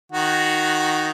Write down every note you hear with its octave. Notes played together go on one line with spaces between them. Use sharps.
D#3 F#4